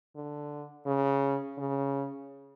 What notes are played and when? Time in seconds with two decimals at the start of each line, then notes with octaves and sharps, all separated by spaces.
0.16 D3
0.87 C#3
1.58 C#3